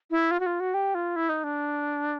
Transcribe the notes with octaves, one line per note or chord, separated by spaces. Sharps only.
E4
F4
F#4
F4
F#4
G4
F4
E4
D#4
D4